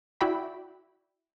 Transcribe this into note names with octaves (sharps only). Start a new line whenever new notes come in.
E4 F#4 D5 E5 G5 B5